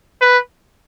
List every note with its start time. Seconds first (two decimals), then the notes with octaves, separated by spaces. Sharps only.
0.22 B4